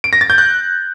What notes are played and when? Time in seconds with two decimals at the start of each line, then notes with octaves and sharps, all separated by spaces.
0.04 D7
0.13 A#6
0.21 A6
0.30 G6
0.38 F#6